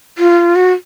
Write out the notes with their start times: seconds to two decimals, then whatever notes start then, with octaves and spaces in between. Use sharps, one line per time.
0.18 F4
0.56 F#4